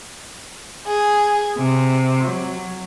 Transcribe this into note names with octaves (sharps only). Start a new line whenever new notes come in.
G#4
C3
F#3